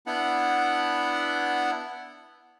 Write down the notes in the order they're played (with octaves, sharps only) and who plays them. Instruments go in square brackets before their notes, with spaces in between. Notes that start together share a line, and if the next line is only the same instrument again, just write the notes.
[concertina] B3 D4 E4 F#5